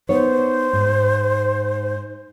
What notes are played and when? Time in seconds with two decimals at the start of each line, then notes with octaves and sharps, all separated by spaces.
0.09 B3 D#4 C5 C#5
0.73 G#2